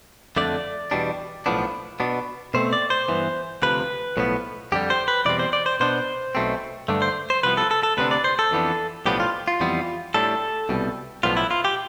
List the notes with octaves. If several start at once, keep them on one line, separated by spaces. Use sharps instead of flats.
F2 D3 A3 D4 D5
E2 B2 G3 D4
B1 A2 F3 B3 D4
B2 B3 D4
B2 A3 C4 C5
D5
C5
G2 E3 B3
D2 C3 F3 B4
B1 A2 F3 B3
F2 D3 G3 G4
C5
B4
E2 B2 G3 C4 D5
C5
D5
C5
B2 B3 D4 C5
B1 B2 A3 C4
G2 D3 A3 D4
C5
C5
C2 C3 F3 B3 B4
A4
A4
A4
D2 C3 G3 B3 D4 B4
D5
C5
A4
F2 E3 B3 D4
B1 A2 F3 B3 D4 G4
F4
F4
F2 E3 G3 B3
A2 G3 D4 A4
C2 B2 G3
B1 A2 F3 B3 D4 F4
E4
F4
G4